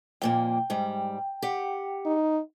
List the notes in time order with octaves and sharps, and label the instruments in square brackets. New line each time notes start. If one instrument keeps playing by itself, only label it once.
[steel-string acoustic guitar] F2 A#2 A#3 [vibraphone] G5
[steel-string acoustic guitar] G#2 G3
G4 F#5
[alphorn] D#4